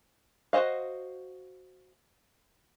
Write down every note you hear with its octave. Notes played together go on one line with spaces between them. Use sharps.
F#4 G#4 C5 D#5 F5